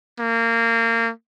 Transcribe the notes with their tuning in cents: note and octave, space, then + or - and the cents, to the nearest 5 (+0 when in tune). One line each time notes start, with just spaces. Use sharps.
A#3 -25